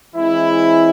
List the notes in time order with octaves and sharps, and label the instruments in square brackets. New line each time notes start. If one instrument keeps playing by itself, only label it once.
[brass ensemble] E3 G#3 C4 E4